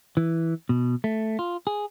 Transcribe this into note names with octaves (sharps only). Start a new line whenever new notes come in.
E3
B2
A3
F4
G#4